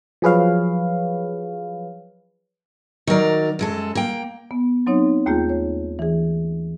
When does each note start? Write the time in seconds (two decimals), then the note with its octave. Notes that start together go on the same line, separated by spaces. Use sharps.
0.22 F3 F#3 G#4 B4 C#5 F5
3.07 D#3 F#3 A#4 D5
3.59 F#2 G#3 A4
3.95 A#3 G5
4.51 B3
4.87 F#3 C4 D#4 C#5
5.26 D#2 A3 A#3 F4 G#4 G6
5.49 C#5
5.99 E3 G#4